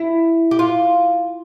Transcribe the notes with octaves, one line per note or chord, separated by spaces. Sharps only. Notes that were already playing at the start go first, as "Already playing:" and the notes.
Already playing: E4
G4
F4